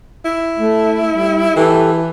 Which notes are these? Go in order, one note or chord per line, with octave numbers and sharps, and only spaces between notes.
E4
A3
G3
E3 G4 A4